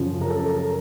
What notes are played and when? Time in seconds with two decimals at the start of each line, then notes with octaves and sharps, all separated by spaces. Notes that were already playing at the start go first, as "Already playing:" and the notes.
Already playing: F#2 C#3 F3
0.21 A#4
0.30 A4
0.39 A#4
0.49 A4
0.56 A#4